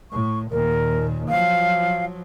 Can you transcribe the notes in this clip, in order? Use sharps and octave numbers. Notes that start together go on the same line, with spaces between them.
A2 C#6
D#2 A#2 A#4
F3 F#3 F5